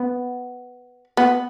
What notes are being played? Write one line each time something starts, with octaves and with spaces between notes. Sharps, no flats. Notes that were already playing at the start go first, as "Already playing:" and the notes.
Already playing: B3
B3